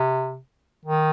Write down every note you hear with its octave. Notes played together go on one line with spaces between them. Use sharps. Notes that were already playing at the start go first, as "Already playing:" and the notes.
Already playing: C3
D#3